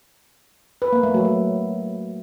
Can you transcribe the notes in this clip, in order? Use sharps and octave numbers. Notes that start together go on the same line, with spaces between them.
B4
A#3
A3
F#3
F#3